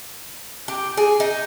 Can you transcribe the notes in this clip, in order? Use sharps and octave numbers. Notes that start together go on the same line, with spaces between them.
G4
G#4
D#4